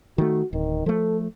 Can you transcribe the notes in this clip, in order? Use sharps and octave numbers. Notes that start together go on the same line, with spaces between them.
D#3 A3 F#4
D1 D#3
F3 A3 A4